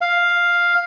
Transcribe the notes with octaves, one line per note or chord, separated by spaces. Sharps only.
F5